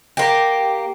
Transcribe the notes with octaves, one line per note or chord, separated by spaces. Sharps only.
A#3 G4